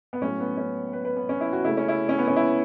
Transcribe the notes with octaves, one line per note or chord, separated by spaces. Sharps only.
B3
A2 F#3 A3 C#4
B3
C#4
B4
B4
B3
C#4
E4
F#4
C#3 A3 E4
C#4
E4
C#4
B3
C#4
E4